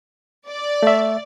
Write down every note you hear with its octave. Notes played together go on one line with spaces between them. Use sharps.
D5
A3 E5